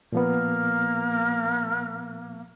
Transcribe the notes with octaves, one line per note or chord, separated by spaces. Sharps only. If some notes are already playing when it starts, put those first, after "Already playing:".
A#2 F3 A#3 B3